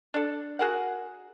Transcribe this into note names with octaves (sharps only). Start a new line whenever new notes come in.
D4 A4
F#4 G#4 A#4 F#5